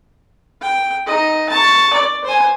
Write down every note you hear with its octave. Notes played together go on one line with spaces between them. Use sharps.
G5
D#4 D#5
A5 C#6
D5
C5 G#5